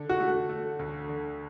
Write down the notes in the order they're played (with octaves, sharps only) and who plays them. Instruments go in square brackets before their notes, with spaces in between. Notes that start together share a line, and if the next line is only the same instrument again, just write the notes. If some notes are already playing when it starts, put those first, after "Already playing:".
Already playing: [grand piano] D3
[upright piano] F#4
[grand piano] A3
A3
D2
D3